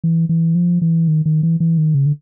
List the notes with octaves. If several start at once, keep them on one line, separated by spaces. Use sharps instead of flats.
E3
E3
F3
E3
D#3
D#3
E3
E3
D#3
C#3
D3